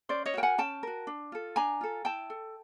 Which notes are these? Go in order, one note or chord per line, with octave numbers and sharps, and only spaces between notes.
C#4 C5 D5
C#5 D#5
F#4 A#4 G5
F#5 G#5
C#4 G5 A5
F#4 A#4
D4
F4 A4
D4 G#5 A#5
F4 A4
E4 G5 A5
A4